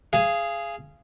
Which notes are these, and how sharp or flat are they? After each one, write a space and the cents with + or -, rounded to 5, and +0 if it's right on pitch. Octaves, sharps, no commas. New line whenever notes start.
G#4 +0 F5 -25